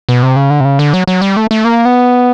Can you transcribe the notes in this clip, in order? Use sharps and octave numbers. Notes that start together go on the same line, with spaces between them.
B2
C3
C#3
D3
C3
C#3
D3
F#3
F#3
G3
A3
A3
A#3
B3